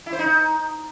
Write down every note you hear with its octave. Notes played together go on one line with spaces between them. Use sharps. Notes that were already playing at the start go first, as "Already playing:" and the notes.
E4
C5
D#4